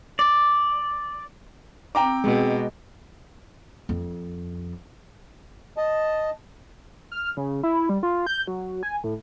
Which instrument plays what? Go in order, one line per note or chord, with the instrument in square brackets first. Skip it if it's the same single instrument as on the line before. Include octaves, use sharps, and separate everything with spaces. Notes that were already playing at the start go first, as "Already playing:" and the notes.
[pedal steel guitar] D5
[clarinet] C4 [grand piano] G5 A#5 D6
[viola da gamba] B2 [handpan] G#3
[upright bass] F2
[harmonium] D#5 A5
[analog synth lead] F6
C#3
E4
G3
F4
G6
F#3
G#5
A2